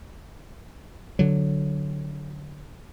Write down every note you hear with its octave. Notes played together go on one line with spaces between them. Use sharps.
D3 F#3